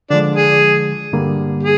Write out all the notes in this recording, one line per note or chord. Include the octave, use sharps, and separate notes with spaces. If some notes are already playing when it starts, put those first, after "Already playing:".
D3 F3 G#3 D4
G#4
G2 D3 G3 A#3
G#4